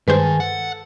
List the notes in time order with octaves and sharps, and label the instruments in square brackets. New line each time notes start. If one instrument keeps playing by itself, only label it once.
[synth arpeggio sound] G2 G#3 C5 [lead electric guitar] D#3 [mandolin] G#4 G#5 A5 [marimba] B4
[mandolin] A4 [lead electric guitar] F#5